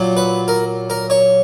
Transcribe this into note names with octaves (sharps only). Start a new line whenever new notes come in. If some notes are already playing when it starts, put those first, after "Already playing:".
Already playing: A#2 F#3
B4
A#4
A#4
C#5